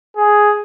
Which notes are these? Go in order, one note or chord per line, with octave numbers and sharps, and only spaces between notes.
G#4